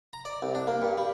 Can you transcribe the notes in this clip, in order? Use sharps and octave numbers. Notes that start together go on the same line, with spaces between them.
A#5
D5
C2
D4
A#3
G2
G3